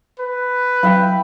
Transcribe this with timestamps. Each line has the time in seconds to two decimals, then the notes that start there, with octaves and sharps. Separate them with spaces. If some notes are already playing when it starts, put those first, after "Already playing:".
0.19 B4
0.83 F#3 E4 E5 G5